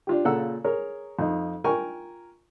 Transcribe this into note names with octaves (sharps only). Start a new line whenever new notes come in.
D4 F4 G4
A#2 C#3 A4 F#5 A#5 E6
G#4 A#4 C#5
F2 D#4
F4 A#4 G5 G#5 C#6